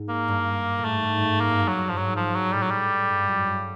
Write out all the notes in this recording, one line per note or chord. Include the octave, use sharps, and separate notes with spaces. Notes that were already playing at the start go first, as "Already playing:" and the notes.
Already playing: G#2
A#3
G2
A2
G#2 A3
G#2
G2
G#2
A#3
G2
F#2
F#3
F#2
G2 F3
G#2 F#3
F3
F#3
A2 G3
F#3
G3
G2
F#2
G2